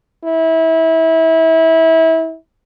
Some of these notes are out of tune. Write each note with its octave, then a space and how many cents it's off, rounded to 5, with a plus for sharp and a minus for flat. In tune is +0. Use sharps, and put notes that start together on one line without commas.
E4 -25